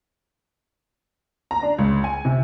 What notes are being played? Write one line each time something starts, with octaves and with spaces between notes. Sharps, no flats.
A#5
D4
C#2
G#5
C3